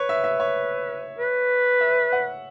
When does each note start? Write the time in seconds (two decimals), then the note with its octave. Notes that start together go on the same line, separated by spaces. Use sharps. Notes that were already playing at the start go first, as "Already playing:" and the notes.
Already playing: B4 C#5
0.09 E5
0.24 E5
0.40 C#5
1.18 B4
1.81 E5
2.13 F#5